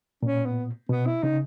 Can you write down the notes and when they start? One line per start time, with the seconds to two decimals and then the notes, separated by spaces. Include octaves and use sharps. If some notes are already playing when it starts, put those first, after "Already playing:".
0.23 A#2 C#4
0.45 B3
0.89 B2 B3
1.06 E4
1.23 C#3 D#4